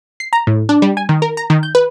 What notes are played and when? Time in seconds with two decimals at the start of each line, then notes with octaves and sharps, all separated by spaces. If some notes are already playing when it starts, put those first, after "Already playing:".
0.20 C7
0.33 A#5
0.47 A2
0.69 D4
0.82 G3
0.97 G#5
1.09 D#3
1.22 A#4
1.37 A#5
1.50 D#3
1.63 G6
1.75 B4